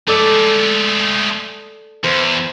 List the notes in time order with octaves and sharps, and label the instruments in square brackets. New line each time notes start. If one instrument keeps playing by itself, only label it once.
[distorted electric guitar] G#3 A3 [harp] A4 D5 E6
[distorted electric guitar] E2 [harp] C5